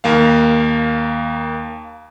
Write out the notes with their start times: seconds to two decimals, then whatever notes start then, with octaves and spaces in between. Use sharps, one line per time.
0.04 D#2 A#3 F5